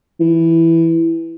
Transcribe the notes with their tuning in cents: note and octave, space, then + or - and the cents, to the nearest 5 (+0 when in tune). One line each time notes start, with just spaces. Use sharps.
E3 +0